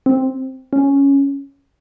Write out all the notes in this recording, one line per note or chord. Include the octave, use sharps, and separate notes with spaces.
C4
C#4